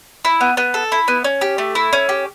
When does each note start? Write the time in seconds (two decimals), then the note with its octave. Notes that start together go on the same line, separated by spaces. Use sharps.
0.25 E4
0.41 B3
0.57 B3
0.74 A4
0.92 E4
1.08 B3
1.24 C#4
1.41 G4
1.58 A3
1.75 E4
1.93 C#4
2.09 G4